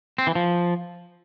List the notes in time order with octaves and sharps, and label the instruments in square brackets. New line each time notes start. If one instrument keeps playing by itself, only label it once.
[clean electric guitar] C4
E3
F3